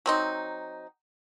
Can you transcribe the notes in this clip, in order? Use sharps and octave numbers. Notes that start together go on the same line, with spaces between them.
F#3 C4 D#4